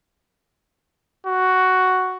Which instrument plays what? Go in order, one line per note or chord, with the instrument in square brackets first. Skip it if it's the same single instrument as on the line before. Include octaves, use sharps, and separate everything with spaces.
[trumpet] F#4